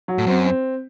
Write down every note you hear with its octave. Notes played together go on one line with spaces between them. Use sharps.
F#3
A2
F#2 C4
C4